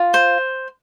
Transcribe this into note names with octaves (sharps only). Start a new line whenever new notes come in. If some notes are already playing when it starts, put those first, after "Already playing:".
Already playing: F4
C5